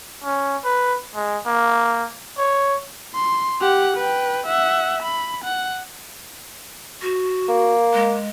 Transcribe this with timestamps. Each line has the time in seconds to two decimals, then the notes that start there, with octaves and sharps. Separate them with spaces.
0.24 C#4
0.64 B4
1.15 G#3
1.46 A#3
2.38 C#5
3.15 C6
3.61 G4 F#5
3.97 B4 G5
4.47 E5 F#5
5.03 B5
5.44 F#5
7.02 F#4
7.48 A#3
7.94 G#3